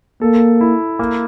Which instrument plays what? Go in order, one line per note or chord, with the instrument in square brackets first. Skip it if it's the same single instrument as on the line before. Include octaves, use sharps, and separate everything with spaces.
[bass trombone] A#3 [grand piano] A4
[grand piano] E4
A#3